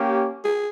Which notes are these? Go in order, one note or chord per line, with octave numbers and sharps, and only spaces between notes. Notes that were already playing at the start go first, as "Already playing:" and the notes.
Already playing: A#3 C#4 G4
G#4